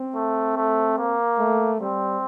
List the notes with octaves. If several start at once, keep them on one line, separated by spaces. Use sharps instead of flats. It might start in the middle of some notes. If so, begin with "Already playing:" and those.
Already playing: C4
A3
A3
A#3
A3
G3 C4